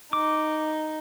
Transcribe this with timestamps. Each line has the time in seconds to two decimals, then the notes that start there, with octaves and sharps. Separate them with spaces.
0.13 D#4 D6